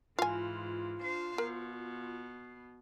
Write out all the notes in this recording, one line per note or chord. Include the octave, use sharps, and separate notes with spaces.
G#2 E3 F4 F5 G#5
D4 C5 F5
B2 A#4